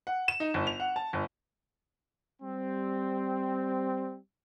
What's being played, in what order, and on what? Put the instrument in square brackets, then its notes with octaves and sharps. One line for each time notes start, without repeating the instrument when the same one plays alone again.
[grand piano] F#5
E7
D#4
G1
F7
F#5
A5
G1
[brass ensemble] G3 C4